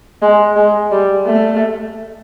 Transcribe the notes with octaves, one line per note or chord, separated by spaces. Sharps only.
G#3
G#3
G3
A3